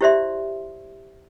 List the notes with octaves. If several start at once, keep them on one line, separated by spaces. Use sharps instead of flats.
E4 G4 C5 D5 E5 C6